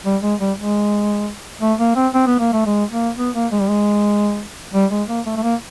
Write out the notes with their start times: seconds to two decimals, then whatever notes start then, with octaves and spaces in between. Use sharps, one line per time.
0.05 G3
0.22 G#3
0.40 G3
0.57 G#3
1.61 A3
1.79 A#3
1.96 C4
2.14 C4
2.27 B3
2.39 A#3
2.53 A3
2.66 G#3
2.91 A#3
3.18 B3
3.35 A#3
3.52 G#3
3.60 G3
3.69 G#3
4.73 G3
4.91 G#3
5.08 A#3
5.26 A3
5.36 A3
5.43 A#3